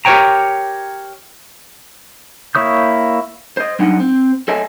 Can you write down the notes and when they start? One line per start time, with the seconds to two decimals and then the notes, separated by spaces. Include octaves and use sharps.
0.05 G4 A#4 C5 C#5 G5 A#5
2.55 A#3 E4 C#5 D#6 G6
3.57 C5 D#5
3.79 G2 F#3 D4 D#4 F#5
4.00 C4
4.48 A4 C#5 D#5 E5 G#5 A5